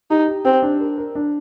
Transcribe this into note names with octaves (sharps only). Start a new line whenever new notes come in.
D#4 G4
G4
C4 G4
D4
A#4
A#4
D4